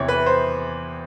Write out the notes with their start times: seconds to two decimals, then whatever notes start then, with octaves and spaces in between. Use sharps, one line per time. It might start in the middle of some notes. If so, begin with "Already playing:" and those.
Already playing: E2 C3 E3 C#5
0.08 B4
0.26 C5